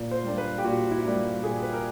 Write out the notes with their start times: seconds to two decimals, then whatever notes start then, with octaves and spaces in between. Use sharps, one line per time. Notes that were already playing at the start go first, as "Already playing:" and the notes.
Already playing: A#2
0.11 C5
0.24 G3 A#3 D4
0.38 B4
0.58 G4
0.64 A#2 F#4
0.91 E4
1.04 G3 A#3 D4
1.43 A#2 G#4
1.63 B4
1.73 A#4